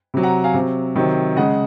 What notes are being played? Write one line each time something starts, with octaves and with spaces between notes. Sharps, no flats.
C3 F#3
F#5 A#5
F5 G#5
C3 F#3
C3 D#3 F#3
C#3 G#3 D#5 F#5